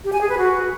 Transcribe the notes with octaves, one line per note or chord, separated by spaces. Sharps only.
G4
G#5
G#4
B4
F#4